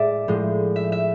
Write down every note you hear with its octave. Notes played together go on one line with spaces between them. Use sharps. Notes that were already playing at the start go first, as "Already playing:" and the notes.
Already playing: A2 G#3 D5 E5
A2 F3 G#3
E5
E5